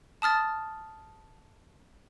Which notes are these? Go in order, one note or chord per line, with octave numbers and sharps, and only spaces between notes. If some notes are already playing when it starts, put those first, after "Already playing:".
A5 D#6 F6 A6